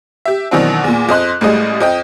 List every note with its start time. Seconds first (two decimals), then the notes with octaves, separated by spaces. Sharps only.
0.25 G4 E5
0.51 B2 D#3 E3 F#3 C4 D4
0.84 E2 A#2
1.09 F2 D#5 C6 F#6
1.41 A1 A2 G3 G#3 D#5
1.80 F2 D#5 G5